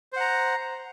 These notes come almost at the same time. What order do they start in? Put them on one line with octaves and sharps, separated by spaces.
C5 F#5 A#5